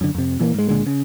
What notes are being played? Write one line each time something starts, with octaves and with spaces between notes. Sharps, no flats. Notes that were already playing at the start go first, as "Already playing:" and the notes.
F#2 D3
F2 C3
A#2 E3 G3 A#3
G#2 G#3
C#2 A#2 D3 G#3
C#3